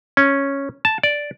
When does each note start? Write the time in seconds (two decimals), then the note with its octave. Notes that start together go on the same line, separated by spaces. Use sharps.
0.17 C#4
0.85 A5
1.03 D5